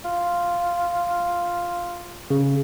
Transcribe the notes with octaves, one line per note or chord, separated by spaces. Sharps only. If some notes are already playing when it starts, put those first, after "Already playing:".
F4
C#3